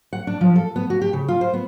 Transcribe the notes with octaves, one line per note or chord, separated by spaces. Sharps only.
F#5
D4
F3
A4
B3
F#4
G4
C#3
F4
C5
B3